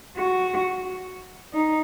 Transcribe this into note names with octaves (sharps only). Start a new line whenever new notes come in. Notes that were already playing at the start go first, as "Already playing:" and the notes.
F#4
D#4